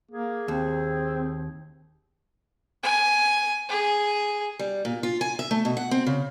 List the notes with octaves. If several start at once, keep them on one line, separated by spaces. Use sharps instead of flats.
A#3 G#4
D#2 C4
G#5
G#4
G3
A#2
F4
G#5
E5
A3
B2
F#5
C4
C#3